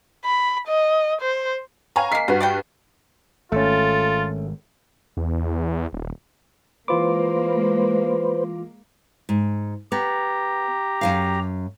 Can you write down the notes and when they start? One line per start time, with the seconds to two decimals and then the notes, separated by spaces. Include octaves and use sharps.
0.24 B5
0.68 D#5
1.21 C5
1.96 B4 C#5 F5 G#5 A#5
2.12 G#3 A#3 B6 C7
2.28 G2 F#3 F#4 B4
2.40 D5 F#5 G5
3.52 G#1 A3 C#4 F4 A4
5.17 E2
5.93 D#1
6.88 E3 G#3 A#3 F4 B4 C5 D6
9.29 G#2
9.92 B3 G4 A#5
11.01 F#2 E3 F5